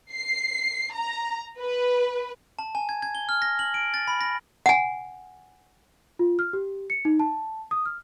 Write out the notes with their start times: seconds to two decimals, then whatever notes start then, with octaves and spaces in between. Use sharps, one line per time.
0.11 C7
0.93 A#5
1.60 B4
2.59 A5
2.75 G#5
2.89 G#6
3.02 G#6
3.15 G7
3.29 F6
3.42 A#6
3.59 F#7
3.74 D7
3.94 A6
4.08 B5
4.21 A#6
4.66 F#5 G#5
6.19 F4
6.39 F6
6.53 G4
6.90 C#7
7.05 D#4
7.19 A5
7.71 D#6
7.85 F6